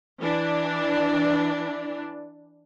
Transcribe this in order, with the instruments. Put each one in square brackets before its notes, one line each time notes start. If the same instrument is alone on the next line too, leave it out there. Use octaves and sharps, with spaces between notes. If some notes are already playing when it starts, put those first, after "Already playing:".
[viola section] E3 D4